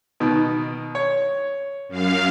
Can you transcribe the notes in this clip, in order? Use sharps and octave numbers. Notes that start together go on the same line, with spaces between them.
B2 D#3
C#5
F#2 F5